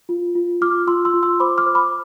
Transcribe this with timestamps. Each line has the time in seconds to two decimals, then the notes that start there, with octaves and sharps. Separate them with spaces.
0.09 F4
0.35 F4
0.61 F4 D6 F6
0.87 F4 C6 E6
1.05 C6 E6
1.14 F4
1.23 C6 E6
1.40 C5 B5 D6
1.58 D6 F6
1.66 C5
1.75 B5 D6